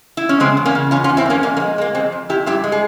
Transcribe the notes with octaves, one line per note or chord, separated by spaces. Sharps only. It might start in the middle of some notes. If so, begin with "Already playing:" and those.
E4
C#4
C#3 G#3 C4
E2
A#3 C#4
C#3
E2 C#4 F4
C#4 F4
E2
C4 E4
E2 A#3 C#4
F2 A#3 C#4
A#3
G#3
G#3 A#3
F2 G#3 C4
F2
F2 E4 G4
G2 E4 G4
G#3
G#4